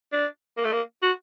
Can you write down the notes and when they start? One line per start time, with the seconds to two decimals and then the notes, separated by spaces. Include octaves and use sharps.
0.12 D4
0.57 A#3
0.65 A3
0.73 A#3
1.03 F#4